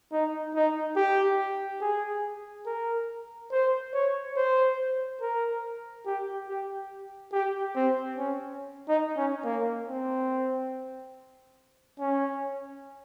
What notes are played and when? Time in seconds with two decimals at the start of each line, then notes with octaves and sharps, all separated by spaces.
0.12 D#4
0.55 D#4
0.96 G4
1.81 G#4
2.66 A#4
3.52 C5
3.93 C#5
4.37 C5
5.21 A#4
6.06 G4
6.48 G4
7.33 G4
7.76 C4
8.17 C#4
8.89 D#4
9.17 C#4
9.44 A#3
9.88 C4
11.99 C#4